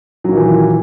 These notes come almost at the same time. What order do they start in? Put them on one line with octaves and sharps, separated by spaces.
F#3 A#2 D#3 E3